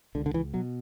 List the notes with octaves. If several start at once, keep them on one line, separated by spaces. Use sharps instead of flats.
C#2 D3
D3
E3
B2 F#3